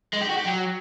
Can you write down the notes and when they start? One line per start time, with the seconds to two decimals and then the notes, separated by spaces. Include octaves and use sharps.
0.14 G#3
0.22 G4
0.30 F#4
0.38 G4
0.46 F#3